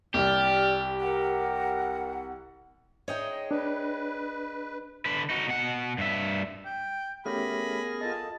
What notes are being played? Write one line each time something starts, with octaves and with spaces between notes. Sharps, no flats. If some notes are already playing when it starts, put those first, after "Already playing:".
C2 G3 G4 D5 G5 F6
A#4 F#5
G#3 D#4 C#5 D#5 G5
D4 B4
D3 B4
D#4 F#4
B2 F#5
G2 E5
G5
A3 B3 C#4 G4 G#4 A#4 B5 A#6
F4 A4 D#5 A5